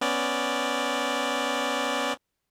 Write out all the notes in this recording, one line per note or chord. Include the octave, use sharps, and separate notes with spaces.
B3 C#4 D5